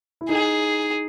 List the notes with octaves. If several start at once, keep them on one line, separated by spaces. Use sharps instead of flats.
E4
D#4 G#4